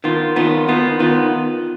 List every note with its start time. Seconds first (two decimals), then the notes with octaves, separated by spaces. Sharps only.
0.04 D#3 B3 F4
0.36 D#3 B3 F4
0.68 D#3 B3 F4
0.99 D#3 B3 F4